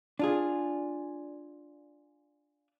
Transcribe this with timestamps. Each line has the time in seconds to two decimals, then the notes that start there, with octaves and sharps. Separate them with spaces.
0.19 D4 F4 G#4